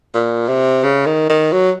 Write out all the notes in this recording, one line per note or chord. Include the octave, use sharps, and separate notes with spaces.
A#2
C3
C#3
D#3
D#3
F#3